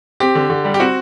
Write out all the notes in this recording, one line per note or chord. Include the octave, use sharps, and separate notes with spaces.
C4 G4
D3
D3
G3
G4
C4 F#4